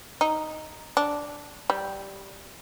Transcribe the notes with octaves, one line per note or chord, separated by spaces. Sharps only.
D#4
D4
G3